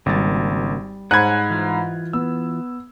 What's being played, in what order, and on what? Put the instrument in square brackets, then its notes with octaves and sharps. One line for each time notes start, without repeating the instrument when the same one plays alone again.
[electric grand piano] G#1 [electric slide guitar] C#3 A#3 F#4 [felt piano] G3 A6
[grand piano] G#2 C5 B5 [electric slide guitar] C#5 F#5 G#5 [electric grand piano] F#6 G#6
[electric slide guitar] E3 F4
[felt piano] B3 [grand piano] E6